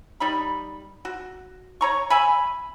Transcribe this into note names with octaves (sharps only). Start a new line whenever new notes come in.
G3 D#4 B5
F#4
C#5 A#5 C#6
E5 G#5 B5